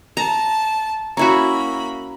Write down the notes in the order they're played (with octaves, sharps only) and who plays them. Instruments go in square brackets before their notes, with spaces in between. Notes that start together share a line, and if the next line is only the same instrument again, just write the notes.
[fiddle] A5 [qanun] A#5
[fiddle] A#3 B5 [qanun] C#4 E4 F#4 [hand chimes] A#5